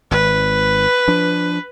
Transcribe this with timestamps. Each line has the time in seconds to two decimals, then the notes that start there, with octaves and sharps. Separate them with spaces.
0.11 G#1 B4
1.08 F3 D4